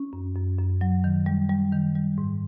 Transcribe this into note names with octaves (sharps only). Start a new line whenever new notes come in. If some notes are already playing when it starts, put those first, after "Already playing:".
Already playing: C#4
F#2
F#2
F#2
F#3
D#3
G3
G3
D#3
G3
G#2